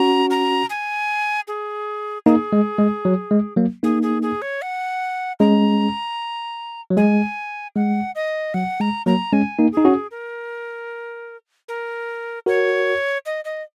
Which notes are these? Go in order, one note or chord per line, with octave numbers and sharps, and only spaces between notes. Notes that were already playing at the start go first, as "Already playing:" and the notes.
Already playing: C#4 F#4 A#5
A#5
G#5
G#4
A#3 D#4 G#4
G#3
G#3
F#3
G#3
F#3 A#3
A#3 D#4 G#4
G#4
G#4
C#5
F#5
G#3 C#4 A#5
F#3
G#3 G#5
G#3 F#5
D#5
F#3 F#5
G#3 A#5
F#3 A#3 A#5
G#3 C#4 G#5
A#3 D#4
G#4
D#4
C#4 F#4
A#4
A#4
F#4 A#4 C#5
D#5
D#5